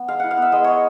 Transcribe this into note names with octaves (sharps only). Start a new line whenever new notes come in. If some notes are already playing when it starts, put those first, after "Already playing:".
Already playing: B3
G#3 F5
E4 F#5
F5
B3 E5
G#3 D#5
G#3 C#5